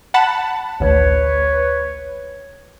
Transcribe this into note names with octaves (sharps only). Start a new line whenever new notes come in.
F#5 A5 B5
A1 D2 B4 C#5